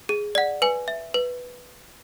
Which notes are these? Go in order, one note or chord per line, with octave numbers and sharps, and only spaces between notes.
G#4
D5 F#5
B4 G#5
E5
B4